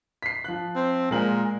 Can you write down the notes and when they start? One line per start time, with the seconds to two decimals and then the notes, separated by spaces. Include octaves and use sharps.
0.22 B6 C7
0.44 F3 F#6
0.76 C4
1.11 A#2 G#3 A#4 F#7